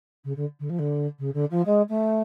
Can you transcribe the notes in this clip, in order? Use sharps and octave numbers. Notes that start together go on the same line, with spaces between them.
C#3
D3
D3
F3
D3
C#3
D3
F3
G#3
A3